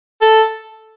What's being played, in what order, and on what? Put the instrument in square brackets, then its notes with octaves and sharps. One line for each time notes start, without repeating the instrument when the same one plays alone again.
[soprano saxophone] A4